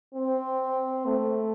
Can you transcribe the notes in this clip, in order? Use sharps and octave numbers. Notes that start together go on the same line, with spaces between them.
C4
A3